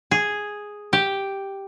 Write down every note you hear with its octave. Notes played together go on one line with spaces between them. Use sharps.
G#4
G4